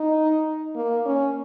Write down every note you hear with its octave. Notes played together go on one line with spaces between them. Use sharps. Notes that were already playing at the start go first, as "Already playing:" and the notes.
Already playing: D#4
A#3
C#4